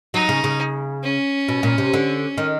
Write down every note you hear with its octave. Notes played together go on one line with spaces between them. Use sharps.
F#3 D#4
C#3
C#3
C#4
B2
A#2
C3
D3
D#3